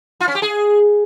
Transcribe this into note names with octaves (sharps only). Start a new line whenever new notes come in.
F4
C#4
G4
G#4